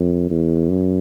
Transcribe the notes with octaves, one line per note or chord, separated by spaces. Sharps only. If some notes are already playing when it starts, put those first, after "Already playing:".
Already playing: F2
E2
F#2